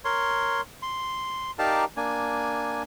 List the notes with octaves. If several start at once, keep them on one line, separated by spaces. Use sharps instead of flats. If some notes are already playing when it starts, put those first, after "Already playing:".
A#4 C#5 C6
C6
D#4 G4 A#4 D5 F5 A5
A#3 D4 G#5